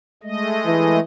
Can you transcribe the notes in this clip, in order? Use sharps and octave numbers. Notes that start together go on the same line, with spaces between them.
G#3 A3 D#5
E3